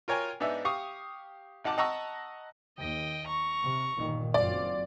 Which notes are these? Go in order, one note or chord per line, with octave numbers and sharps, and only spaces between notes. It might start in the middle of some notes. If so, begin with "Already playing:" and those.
F4 A#4 C#5 G5 G#5
G#2 B3 D4 D#4 E5
G4 F5 C#6 D#6
G#1 D#4 F#5 A5 D6
D#5 F#5 A5 A#5 C#6 E6
D#2 D#5 G5
A#5 C#6
C3
G1 A#2 D#3
F#1 F#2 C4 F4 D5